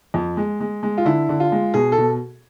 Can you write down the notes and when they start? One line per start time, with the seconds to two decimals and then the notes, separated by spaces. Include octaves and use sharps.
0.14 F2
0.37 G#3
0.60 G#3
0.83 G#3
0.98 F4
1.05 D3 E4
1.29 D3
1.40 F4
1.52 G#3
1.74 B2 G#4
1.92 A4
1.98 B2